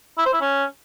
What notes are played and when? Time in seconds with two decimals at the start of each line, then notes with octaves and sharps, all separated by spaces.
0.18 E4
0.25 C5
0.33 E4
0.41 C#4